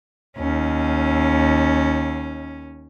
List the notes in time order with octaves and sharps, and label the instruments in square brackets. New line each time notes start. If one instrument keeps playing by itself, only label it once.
[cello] D#2 C#4